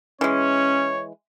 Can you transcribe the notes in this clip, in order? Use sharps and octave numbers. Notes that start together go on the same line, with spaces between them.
E3 G#3 C#4 C#5